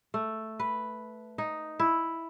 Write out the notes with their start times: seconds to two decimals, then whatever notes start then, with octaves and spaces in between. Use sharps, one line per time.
0.14 A3
0.60 B4
1.38 D#4
1.80 E4